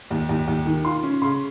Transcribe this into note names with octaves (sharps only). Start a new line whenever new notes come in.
D#2
D#2
D#2
D#3
F4 C6
C#4
C#3 C6